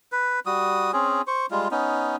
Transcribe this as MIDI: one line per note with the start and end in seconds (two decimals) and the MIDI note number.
0.12 0.40 71
0.46 0.91 55
0.46 0.91 66
0.46 0.91 87
0.93 1.22 60
0.93 1.22 61
0.93 1.22 68
1.27 1.46 72
1.27 1.46 85
1.51 1.68 55
1.51 1.68 56
1.51 1.68 65
1.71 2.16 59
1.71 2.16 61
1.71 2.16 63